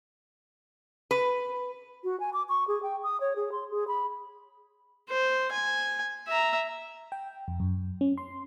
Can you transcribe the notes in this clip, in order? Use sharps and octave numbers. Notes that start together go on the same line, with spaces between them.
B4
F#4
G#5
D6
C#6
G#4
G5
D#6
C#5
G#4
C6
G#4
B5
C5
G#5
E5 A#5
G5
F2
F#2
C#4
C6